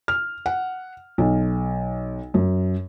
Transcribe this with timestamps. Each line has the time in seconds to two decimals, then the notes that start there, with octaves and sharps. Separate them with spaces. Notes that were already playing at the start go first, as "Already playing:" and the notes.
0.08 F6
0.46 F#5
1.18 B1
2.34 F#2